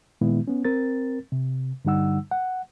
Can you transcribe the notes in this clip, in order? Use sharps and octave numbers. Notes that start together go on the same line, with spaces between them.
A#2 D#3 G#3 B3 E4
B3 C#4
C4 A#4 A6
C3
G2 D3 G3 D#4 F#5 E6
F#5